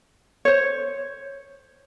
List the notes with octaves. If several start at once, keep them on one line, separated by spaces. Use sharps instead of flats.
C5 C#5